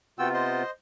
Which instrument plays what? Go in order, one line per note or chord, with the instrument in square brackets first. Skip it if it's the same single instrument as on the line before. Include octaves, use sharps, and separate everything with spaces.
[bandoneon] C3 B3 F4 [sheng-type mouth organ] F#4 G5 E6
[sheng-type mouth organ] C5 D#5 C6